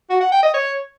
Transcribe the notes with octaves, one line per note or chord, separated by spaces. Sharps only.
F#4
F#5
G5
D#5
C#5